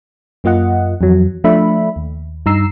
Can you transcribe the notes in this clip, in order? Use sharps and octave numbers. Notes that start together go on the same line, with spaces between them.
F#2 A#3 F4 D#5 F#5
F2 E3 F#3
F3 A3 D4 E5 B5
D#2
G2 D#4 A#5 E6 C7